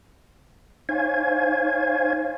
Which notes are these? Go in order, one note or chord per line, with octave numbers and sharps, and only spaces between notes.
D#4 C5 C#5 F5 G#5 G#6